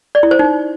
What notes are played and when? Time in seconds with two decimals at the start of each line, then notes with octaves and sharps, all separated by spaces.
0.15 D5
0.23 E4
0.31 C5
0.39 D#4